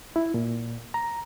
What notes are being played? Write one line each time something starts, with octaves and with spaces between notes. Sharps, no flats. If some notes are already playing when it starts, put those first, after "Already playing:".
E4
A#2
A#5